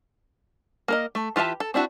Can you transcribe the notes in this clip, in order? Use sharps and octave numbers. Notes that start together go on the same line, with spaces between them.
A#3 A#4 D#5
A3
E3 F4 G4 E5 A5
A4
C4 D4 E4 F#4